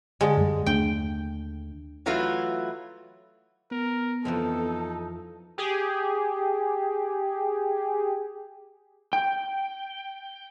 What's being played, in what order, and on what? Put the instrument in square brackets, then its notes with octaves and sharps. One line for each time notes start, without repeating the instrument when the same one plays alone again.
[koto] D3 G#3
[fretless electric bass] F#2 G3
[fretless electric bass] D#2 A3 D4 [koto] G5
[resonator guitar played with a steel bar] E3 F#3 A3 E4 F4 B4
[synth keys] B3 [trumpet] A#4
[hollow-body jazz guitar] F2 E3 F3 [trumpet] D#4 [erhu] A4
[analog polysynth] G4 G#4
[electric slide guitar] G5